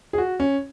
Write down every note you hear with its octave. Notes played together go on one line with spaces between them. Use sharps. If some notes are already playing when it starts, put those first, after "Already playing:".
G#4
F#4
C#4